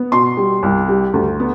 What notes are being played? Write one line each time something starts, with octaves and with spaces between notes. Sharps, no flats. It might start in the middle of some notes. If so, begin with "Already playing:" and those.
Already playing: B3
B2 C6
G3
C2
G3
D2
B3